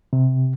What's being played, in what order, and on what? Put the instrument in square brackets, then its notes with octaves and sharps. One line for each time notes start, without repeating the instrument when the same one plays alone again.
[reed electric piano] C3